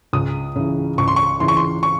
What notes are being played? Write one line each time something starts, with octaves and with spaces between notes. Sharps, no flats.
C#2 D#6
C#3 E3
C#2 C#6
C6
C#6
C#3 E3 C6
C#6
C6
C#6